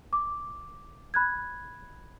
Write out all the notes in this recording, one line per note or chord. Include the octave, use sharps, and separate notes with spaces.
D6
B5 F#6 G#6